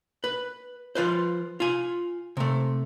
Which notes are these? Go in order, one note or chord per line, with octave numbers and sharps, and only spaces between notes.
B4
F3 F4 B4 C5
F4 G#5
C3 A3